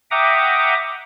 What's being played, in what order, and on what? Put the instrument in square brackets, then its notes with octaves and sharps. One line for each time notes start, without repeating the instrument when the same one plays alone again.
[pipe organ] E5 F#5 G5 A#5 D6 D#6